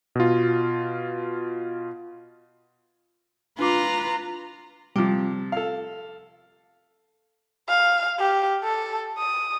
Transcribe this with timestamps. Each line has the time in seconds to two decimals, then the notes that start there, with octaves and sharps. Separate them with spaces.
0.15 B2 F4
3.59 D4 F4 B4 A#5 D6
4.96 C3 F3 G3
5.52 A4 F5
7.69 F5
8.19 G4
8.64 A4
9.18 D#6